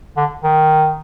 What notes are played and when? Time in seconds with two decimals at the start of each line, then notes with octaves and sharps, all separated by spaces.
0.17 D3
0.43 D#3